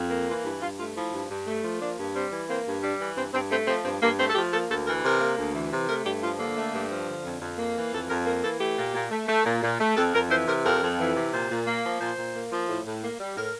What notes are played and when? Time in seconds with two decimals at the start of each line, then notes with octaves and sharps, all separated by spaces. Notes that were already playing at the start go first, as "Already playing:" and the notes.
Already playing: F2
0.11 A#3
0.28 E3 F4
0.44 G2 E4
0.61 G2 F4
0.79 A3 F4
0.95 F3 E4
1.12 G2
1.29 G2
1.47 A3
1.64 F3
1.80 A#3 D4
1.97 G2
2.15 G3 C4
2.32 E3
2.48 A#3 C4
2.66 G2
2.82 G3 D4
3.00 E3
3.16 G2 C4
3.33 G2 C4
3.50 A3 C4
3.67 F3 C4
3.84 G2 C4
4.01 G2 A#3
4.19 A3 C4
4.29 A4
4.35 F3 G4
4.52 A#3 A4
4.69 D2 A4
4.86 E3 A#4
5.03 C3 A#4
5.20 A#3
5.37 D2
5.54 E3
5.72 C3
5.88 A3 A#4
6.05 G2 G4
6.22 F3 F4
6.39 D3 A#3
6.56 A3
6.73 G2
6.90 F3
7.07 D3
7.25 F2
7.41 F2
7.58 A#3
7.76 E3
7.92 F2 A4
8.09 F2 A#4
8.26 A#3 A#4
8.43 E3 A4
8.60 A3 G4
8.77 A#2
8.94 A#2
9.11 A3
9.28 A3
9.45 A#2
9.62 A#2
9.79 A3
9.96 F2 A4
10.14 F2 A#4
10.30 E3 C5
10.47 C3 A#4
10.64 F2 A#4
10.81 F2
10.99 E3
11.15 C3
11.32 A#2 C5
11.50 A#2
11.67 A#3
11.83 F3
12.00 A#2 C5
12.17 A#2
12.34 A#3
12.51 F3
12.69 A2
12.86 A2
13.02 A#3
13.19 G3
13.36 A2 A#4